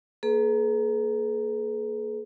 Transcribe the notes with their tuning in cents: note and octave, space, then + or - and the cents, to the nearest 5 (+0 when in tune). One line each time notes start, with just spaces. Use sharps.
A#3 +0 G#4 +45 B4 +0